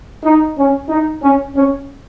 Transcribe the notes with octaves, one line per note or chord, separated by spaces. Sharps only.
D#4
C#4
D#4
C#4
C#4